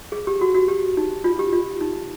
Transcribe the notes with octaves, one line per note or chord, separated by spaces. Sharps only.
G#4
G4
F#4
F#4
G4
D#4
F4
G4
F4
D#4